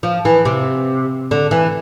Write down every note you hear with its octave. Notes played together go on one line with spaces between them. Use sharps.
F3
E3
C3
D3
E3